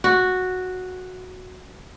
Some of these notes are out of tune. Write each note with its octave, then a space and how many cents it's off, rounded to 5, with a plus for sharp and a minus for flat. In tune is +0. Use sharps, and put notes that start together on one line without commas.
F#4 -5